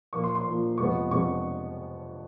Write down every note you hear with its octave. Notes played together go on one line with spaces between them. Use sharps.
A#2 F3 A#3 C#6
C6
C6
A#2 F3 A#3
F2 C3 F3 G#3 B3 C#6
F2 C3 F3 G#3 B3 C#6